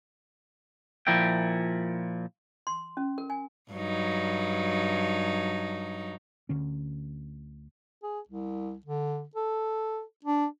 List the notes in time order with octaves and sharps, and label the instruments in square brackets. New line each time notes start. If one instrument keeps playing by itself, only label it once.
[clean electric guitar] A#2 F3 E4 A#4 E5 G5
[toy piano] C6
C#4
A#4
G#5
[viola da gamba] G2 F#3 D#4
[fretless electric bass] D2 D3 C#4
[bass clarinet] G#4
C2
D3
A4
D4